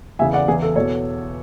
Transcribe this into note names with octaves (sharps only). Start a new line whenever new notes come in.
E2 C#3 E3 E5 G#5
D5 F#5
E2 C#3 E3 G#4
A4
E2 B2 A4 C#5